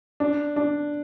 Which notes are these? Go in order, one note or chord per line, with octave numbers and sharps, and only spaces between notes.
D4
D4